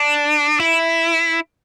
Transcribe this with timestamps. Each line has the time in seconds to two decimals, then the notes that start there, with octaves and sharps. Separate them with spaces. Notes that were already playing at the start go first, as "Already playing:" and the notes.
Already playing: D4
0.60 E4